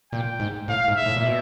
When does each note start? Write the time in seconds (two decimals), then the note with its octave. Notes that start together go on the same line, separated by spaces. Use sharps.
0.12 A#2 G5
0.40 G#2
0.68 A2 F5
0.88 G#2
0.96 E5
1.06 A2
1.16 A#2
1.26 B2